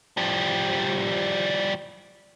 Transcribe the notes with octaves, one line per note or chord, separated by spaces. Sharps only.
F3 G3